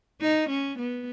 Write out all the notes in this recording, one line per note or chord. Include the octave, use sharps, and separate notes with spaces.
D#4
C#4
B3